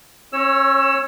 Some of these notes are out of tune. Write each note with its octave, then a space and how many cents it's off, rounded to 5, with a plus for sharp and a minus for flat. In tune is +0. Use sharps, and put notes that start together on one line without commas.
C#4 -30 C#5 +0 E6 +20